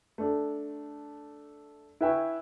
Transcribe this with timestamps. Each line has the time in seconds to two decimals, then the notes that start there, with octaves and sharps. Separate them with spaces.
0.18 A3 D4
2.01 E4 B4 E5 G5 G#5 C#6